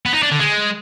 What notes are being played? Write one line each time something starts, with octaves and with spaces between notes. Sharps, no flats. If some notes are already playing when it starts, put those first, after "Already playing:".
B3
D#4
D4
D3
G#3